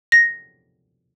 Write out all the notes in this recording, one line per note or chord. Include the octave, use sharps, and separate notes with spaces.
A#6